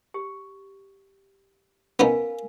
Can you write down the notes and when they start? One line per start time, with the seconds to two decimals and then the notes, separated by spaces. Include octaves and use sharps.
0.14 G4
1.99 B3 C#4 D#4 A#4 F5 G#5